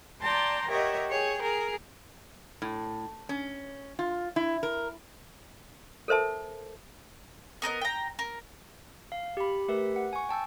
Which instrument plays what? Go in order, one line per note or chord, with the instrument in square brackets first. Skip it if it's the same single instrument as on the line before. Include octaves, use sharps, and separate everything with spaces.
[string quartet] D5 G5 A5 A#5 C6
G4 A#4 C#5 D#5 E5 F#5
G#4 C#5 G5
G#4 A#4
[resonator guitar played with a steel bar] A2
C#4
F4
E4
A#4
[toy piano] A4 A#4 C5 E5 A5
[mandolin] B3 A#4 C5 D#5
G5 A#5
A#4
[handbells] F5
G4 B5
A3 G4 A#4 B4 E5
F#5
G#5 C#6
G5 A5 E6 G6